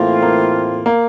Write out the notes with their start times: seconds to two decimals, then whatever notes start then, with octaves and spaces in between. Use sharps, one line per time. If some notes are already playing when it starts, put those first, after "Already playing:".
Already playing: A2 E3 A3 A#3 C4 F4
0.22 A#3
0.86 A#3